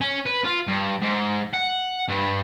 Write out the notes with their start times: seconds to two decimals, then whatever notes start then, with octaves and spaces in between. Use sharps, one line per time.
0.01 C#4
0.26 B4
0.45 F4
0.68 G2
1.01 G#2
1.54 F#5
2.08 G2